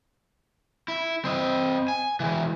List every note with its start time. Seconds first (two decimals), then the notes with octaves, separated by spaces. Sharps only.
0.88 E4
1.25 C4 D#5
1.88 G#5
2.20 E3 G#3